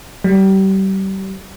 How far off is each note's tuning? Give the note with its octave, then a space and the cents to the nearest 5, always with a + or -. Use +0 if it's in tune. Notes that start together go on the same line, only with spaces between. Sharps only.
G3 -30